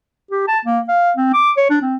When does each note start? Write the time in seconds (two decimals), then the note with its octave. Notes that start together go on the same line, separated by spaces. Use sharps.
0.31 G4
0.48 A5
0.65 A#3
0.88 F5
1.17 C4
1.33 D6
1.57 C#5
1.70 D4
1.82 C4